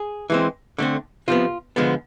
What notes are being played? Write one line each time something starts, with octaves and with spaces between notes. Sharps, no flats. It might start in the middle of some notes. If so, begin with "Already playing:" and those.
Already playing: G#4
E3 G#3 C4
D3 A3 C4
C3 F3 B3 F4
D3 F3 G#3 B3